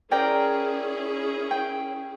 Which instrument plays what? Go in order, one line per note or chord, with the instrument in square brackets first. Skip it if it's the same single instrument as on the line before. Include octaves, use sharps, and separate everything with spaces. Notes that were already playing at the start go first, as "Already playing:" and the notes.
[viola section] C#4 E4 G#4 [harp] A#4 D5 G5
[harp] G5